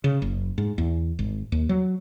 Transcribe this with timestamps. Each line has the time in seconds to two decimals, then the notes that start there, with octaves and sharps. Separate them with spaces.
0.04 C#3
0.22 F#1
0.58 G#2
0.78 E2
1.19 G#1
1.52 D#2
1.69 F#3